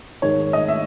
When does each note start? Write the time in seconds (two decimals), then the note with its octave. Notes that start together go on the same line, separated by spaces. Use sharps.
0.22 G#2 D#3 G#3 C#5
0.53 D#5
0.68 E5